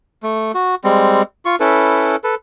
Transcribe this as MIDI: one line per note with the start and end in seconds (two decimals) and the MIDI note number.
0.23 0.52 57
0.54 0.75 66
0.84 1.22 55
0.84 1.22 56
0.84 1.22 60
1.45 1.56 65
1.45 1.56 85
1.60 2.16 61
1.60 2.16 64
1.60 2.16 69
1.60 2.16 71
2.24 2.35 69
2.24 2.35 71